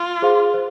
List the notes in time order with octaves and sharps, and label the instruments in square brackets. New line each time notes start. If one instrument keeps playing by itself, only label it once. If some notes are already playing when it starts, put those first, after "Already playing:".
Already playing: [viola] F4
[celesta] G#4 C5 F5 C6
C5